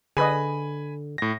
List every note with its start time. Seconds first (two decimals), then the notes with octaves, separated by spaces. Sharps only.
0.17 D3 G#4 B4 D#5 G#5 B5
1.18 A2 A#6